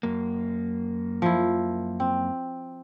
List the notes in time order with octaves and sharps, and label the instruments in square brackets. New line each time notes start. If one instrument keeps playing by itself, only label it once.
[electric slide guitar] F#2 A#3
[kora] F3 E4
C4